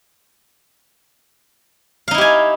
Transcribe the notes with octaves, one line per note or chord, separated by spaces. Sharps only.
D#4 E4 G4 F5 G#5